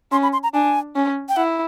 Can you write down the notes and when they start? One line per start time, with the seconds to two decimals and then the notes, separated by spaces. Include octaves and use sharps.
0.12 C#4 C6
0.23 B5
0.33 C6
0.43 A#5
0.54 D4 G#5
0.96 C#4
1.29 G5
1.36 E4 F#5